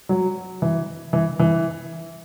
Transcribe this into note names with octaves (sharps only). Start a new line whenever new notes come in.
F#3
E3
E3
E3